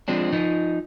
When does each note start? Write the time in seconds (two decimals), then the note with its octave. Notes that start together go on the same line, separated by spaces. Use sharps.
0.08 F3 G#3 C4 D4
0.33 F3 D#4